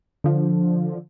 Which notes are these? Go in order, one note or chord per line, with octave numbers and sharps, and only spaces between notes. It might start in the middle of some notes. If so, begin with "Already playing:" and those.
D3 F3